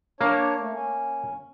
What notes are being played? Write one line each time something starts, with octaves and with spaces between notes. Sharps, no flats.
A#3 D4 C#5
A3
C#4